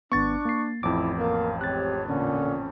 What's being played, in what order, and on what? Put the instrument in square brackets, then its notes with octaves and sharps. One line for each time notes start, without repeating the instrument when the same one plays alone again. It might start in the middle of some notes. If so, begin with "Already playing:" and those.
[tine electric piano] G#1 B3 [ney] D4 [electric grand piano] C#6 A6
[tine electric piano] A#3 C7
[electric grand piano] A1 F2 [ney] E4 [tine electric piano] D6
[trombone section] A#3 A#4 [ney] F5
[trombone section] G#3 C4 G4 [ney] C#5 [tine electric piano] F#6 A6
[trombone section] A#2 D3 [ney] C#4